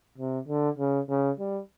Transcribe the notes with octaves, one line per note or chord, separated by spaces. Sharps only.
C3
D3
C#3
C#3
G3